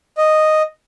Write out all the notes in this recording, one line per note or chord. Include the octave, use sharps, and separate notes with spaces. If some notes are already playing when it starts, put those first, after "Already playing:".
D#5